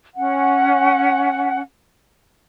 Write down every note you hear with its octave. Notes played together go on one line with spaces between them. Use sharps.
C#4 F#5